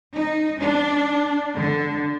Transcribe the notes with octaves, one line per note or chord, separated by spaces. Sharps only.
D#4
D4
D3